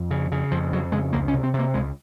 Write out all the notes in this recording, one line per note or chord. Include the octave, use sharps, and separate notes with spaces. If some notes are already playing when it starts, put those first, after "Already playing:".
Already playing: F2
C#3
C#3
F2 F3
F2 F#3
C#3 G#3
C#2 A#3
C#4
C3
C4
C3
A#3
C#2 G#3